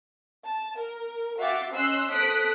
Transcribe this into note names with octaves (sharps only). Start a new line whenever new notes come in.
A5
A#4
F#4 E5 F5 G5 D6 A6
C#4 D#5 C6 E6 F#6 C7
A4 C5 D#6 F#6 B6 D7